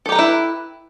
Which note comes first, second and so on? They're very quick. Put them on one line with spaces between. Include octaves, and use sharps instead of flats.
A4 G4 A#5 B4 E4